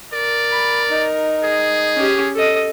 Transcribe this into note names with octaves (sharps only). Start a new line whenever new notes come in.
A#4 D5
B5
D#4
G#4
C#4 G4
A4 D#5